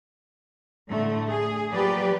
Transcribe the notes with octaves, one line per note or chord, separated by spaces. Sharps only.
A2 D3 A3
G#4
F3 F#3 A#3 G4 B4 D5